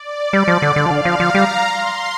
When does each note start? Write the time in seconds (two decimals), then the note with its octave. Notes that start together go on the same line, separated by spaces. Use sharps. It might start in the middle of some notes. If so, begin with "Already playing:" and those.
Already playing: D5
0.33 G3
0.48 F3
0.62 D3
0.76 D3 F5
0.86 F3
0.91 D3
1.05 F3
1.20 F3 A#5
1.34 G3
1.63 C6